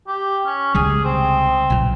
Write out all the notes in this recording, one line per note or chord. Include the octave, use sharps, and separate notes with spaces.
G4
C#4
C#2 C3 G3 G#4
C4
B1 A#2